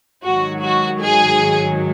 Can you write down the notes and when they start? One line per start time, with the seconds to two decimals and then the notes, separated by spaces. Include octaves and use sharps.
0.23 G#2 D#3 F#3 F#4
0.62 F#4
1.01 G#4